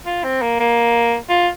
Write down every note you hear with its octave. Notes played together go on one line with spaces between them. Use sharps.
F4
C4
A#3
A#3
F4